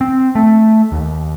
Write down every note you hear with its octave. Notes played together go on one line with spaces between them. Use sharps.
C4
A3
D#2